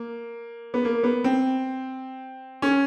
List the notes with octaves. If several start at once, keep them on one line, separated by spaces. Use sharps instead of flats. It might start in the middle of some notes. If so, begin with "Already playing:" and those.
Already playing: A#3
B3
A#3
B3
C4
C#4